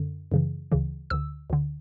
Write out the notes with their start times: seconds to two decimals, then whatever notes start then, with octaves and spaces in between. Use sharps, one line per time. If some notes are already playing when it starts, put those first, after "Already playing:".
Already playing: F#2 D3
0.32 F#2 C#3 E3
0.72 D2 C#3 E3
1.10 D2 D3 E6
1.50 D2 D3